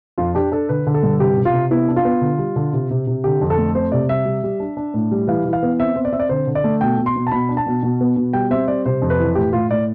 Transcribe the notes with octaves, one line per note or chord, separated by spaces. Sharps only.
F2 F4
D4 G4
D4 A4
D3 B4
D3
A4
G2
C3 G4
C3
F4
C3
B3 E4
D4
F4
B3
D3
G3
D3
C3
C3
C3
D3 G4
F2
A4
A3
C4 C5
C3 D5
G3 E5
G3
G3
D4
D4
A2
G3
E3 F5
E3
F5
B3
C4 E5
C4
D5
C4 E5
D5
D3 C5
D3
D5
A3
B2 G5
B2
C6
B2
A5
B2 B5
D4
A5
B2
B2
B3
B2
G3 G5
C4 E5
G3 D5
C3 C5
F2
B4
E3
A2 G4
A2 F4
A2 D5